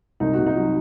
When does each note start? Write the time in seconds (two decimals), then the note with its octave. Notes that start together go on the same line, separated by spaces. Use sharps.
0.20 C2 D#4
0.33 C3 F#4
0.46 D#4
0.55 F#3